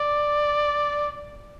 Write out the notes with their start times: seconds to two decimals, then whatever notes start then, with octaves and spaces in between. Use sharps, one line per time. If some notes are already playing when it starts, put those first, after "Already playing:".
Already playing: D5